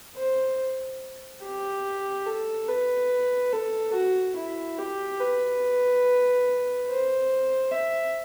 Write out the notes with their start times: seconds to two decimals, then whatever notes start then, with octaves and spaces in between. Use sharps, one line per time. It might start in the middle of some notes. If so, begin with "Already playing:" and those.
0.16 C5
1.43 G4
2.26 A4
2.68 B4
3.53 A4
3.94 F#4
4.36 E4
4.78 G4
5.20 B4
6.88 C5
7.72 E5